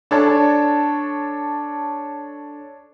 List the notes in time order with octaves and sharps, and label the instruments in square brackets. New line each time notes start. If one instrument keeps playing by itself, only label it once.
[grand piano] D4 A4 C#5 A5